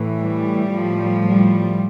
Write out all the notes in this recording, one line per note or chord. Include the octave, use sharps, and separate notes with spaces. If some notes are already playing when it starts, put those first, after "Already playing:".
Already playing: A2 E3
G3
A2 F3
G3